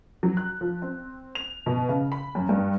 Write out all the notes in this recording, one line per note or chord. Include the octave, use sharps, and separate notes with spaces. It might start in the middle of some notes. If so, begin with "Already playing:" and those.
F#3
F#6
F3
C4
F7
B2
C#3
B5
F#2
G2